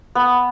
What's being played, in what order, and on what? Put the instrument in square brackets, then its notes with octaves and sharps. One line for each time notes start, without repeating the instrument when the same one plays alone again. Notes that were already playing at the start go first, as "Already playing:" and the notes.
[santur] B3